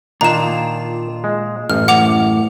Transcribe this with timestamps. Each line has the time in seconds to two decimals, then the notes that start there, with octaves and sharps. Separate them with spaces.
0.21 A#2 D#3 D4 F4 A#5 E7
1.24 G#3
1.70 A1 F#2 A2 F6
1.88 F#5 D6 F7